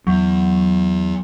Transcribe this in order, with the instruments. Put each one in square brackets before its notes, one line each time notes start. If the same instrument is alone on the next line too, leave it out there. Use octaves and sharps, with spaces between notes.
[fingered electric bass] E2 [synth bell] F#3